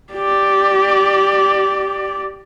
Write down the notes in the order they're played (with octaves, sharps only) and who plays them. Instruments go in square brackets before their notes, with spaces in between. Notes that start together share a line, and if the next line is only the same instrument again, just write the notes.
[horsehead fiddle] G4 D5